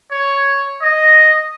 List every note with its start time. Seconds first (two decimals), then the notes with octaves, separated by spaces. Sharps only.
0.11 C#5
0.82 D#5